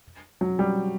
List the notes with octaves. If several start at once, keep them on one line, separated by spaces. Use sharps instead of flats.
F#3
G3